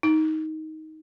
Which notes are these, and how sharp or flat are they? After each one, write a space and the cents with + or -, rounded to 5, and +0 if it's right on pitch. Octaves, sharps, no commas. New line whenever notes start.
D#4 +15